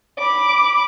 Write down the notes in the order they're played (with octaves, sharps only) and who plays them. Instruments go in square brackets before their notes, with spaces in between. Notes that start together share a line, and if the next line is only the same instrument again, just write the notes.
[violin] B5 D6